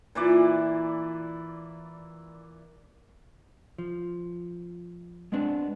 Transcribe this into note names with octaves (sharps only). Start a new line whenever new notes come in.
A#2 E3 B4 D5
F3
G#3 B3 C4 D4